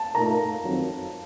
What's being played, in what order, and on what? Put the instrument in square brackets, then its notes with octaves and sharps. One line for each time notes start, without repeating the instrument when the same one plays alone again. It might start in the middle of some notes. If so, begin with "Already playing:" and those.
Already playing: [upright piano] A5
[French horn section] A#2 A3 D#4 A#4 [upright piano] A#5
[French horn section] F2 D#3 F#3 C4